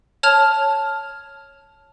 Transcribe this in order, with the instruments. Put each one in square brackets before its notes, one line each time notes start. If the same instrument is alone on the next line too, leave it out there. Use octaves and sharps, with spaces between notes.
[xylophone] C#5 A5 F6 G#6 F7